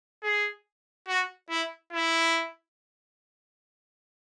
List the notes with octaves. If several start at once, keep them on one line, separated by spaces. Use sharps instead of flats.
G#4
F#4
E4
E4